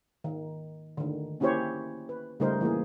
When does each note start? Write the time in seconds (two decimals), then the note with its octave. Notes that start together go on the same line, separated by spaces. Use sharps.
0.24 D#3
0.97 D3 D#3
1.40 A#3 C#4 E4 G4 C5 C#5
2.09 B4
2.40 C#3 G3 A3 D#4 A#4 C5
2.61 E3 A#3 G#4